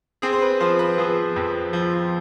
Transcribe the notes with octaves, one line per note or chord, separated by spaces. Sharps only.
C4 G#4
C5
B4
F3 C5
B4
F3 G#4
F2
F3